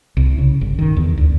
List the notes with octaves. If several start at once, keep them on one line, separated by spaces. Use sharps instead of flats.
C2
C#3
G1
D#3
E2
D2